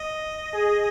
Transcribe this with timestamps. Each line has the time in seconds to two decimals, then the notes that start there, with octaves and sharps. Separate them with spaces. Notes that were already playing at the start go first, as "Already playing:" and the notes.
Already playing: D#5
0.54 G#4